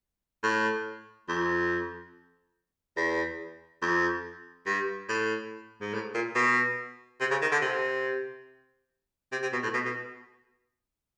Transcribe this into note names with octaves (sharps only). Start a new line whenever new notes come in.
A2
F2
E2
F2
G2
A2
G#2
A2
A#2
B2
C3
C#3
D#3
D3
C3
C3
C3
B2
A2
B2
B2